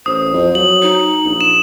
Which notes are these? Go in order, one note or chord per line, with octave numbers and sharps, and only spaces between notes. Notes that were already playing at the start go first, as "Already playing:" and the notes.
A1 C5 D#6
F2
F#3 F#7
D#4
A#1
E7